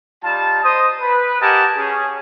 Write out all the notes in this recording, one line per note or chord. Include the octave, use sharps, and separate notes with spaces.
G3 D#4 F4 A5
C5 D#5 D#6
B4
G4 A#4 D#5 F#5 G#5 A5
C#4 G#4